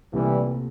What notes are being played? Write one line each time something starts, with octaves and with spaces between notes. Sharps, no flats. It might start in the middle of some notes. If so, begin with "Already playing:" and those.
C2 A#2 E3 G3 A3 C4